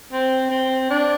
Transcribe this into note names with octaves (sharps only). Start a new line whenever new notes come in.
C4
C4
D4